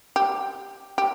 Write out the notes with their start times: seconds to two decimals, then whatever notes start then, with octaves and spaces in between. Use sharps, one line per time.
0.16 G4
0.98 G4